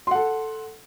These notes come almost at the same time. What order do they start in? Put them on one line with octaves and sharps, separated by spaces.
C6 F#5 A4